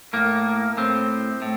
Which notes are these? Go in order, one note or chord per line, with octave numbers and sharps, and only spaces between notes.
A2 A#3
A2 C4
A2